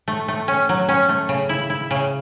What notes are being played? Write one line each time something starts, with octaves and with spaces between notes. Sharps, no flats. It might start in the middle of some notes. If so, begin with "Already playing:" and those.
A3
A3
C#4
F#3
C#4
A3
C#3
E4
E4
C#3